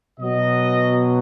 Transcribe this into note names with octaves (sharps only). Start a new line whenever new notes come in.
B2 F#3 D#5